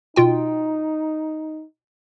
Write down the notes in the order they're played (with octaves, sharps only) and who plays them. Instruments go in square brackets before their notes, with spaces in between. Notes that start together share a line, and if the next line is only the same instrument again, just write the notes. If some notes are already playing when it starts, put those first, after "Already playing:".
[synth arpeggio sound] B2 F4 G5 [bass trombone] D#4